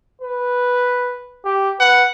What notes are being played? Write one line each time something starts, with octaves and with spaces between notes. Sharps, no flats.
B4
G4
B4 F#5